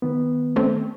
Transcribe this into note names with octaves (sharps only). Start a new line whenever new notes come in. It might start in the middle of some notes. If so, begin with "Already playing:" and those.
D#3 B3
A3 C4 C#4